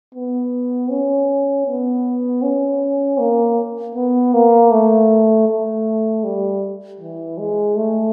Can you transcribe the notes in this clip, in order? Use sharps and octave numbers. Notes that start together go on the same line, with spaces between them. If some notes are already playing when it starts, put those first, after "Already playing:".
B3
C#4
B3
C#4
A#3
B3
A#3
A3
A3
G3
E3
G#3
A3